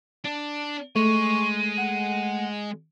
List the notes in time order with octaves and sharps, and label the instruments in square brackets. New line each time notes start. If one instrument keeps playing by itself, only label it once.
[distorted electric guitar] D4
[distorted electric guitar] G#3 [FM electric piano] A3 [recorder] C#6 [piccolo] D#7
[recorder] F#5